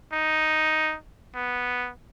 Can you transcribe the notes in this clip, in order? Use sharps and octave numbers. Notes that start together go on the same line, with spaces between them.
D#4
B3